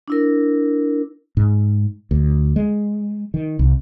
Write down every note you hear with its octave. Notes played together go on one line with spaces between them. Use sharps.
D4 E4 A#4
G#2
D2
G#3
D#3
C2